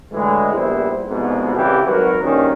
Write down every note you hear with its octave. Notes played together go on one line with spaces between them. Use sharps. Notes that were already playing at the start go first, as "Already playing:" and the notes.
D2 A2 E3 G#3
A#1 G3 B3 E4 C5
C2 F2 G#2 B2
C2 C#3 E3 G4
G#1 F#3 F#4 A#4 B4
A#1 G2 A#2 D#3 C#4